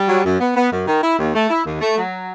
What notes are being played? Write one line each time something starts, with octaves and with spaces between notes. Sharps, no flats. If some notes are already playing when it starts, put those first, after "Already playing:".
Already playing: G3
F#3
F#2
B3
B3
F#2
D#3
E4
D#2
A3
E4
D#2
A3
F#3